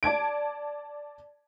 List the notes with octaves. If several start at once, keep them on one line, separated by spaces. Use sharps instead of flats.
D5 A5 G#6 D7